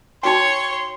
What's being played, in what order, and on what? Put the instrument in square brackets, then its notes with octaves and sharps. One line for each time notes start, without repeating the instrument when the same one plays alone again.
[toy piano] D#4 F#4 G5 [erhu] C#5 [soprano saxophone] C6